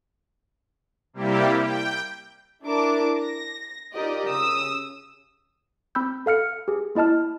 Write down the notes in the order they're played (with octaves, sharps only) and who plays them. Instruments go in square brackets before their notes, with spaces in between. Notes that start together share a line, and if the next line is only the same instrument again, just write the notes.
[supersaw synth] C3 G3 A#3 E4 G4
G5
[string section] D4 E4 A#4 A5 D6
A#6
D#4 F4 G4 A#4 D5 D#5
C#3 D#6 E6
[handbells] C4 B5 E6 G6
A4 F5 F6 C#7
G4 G#4
A#3 E4 D#5 A5 F6